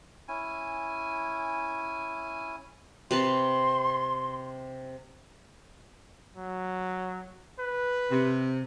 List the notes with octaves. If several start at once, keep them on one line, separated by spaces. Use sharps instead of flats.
C#4 E4 G#5
C3 B4 A5 C6
F#3
B4
C3